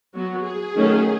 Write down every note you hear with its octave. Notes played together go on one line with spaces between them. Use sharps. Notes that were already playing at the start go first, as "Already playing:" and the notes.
F#3 B3 F#4
G#4
D#3 F#3 A3 C#4